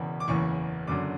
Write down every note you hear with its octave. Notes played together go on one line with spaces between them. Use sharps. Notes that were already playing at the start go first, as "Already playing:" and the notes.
Already playing: E1 E2 C#3 E3 B5
D6
F#1 E2 C#3 E3 C#6
F#1 F#2 D3 D6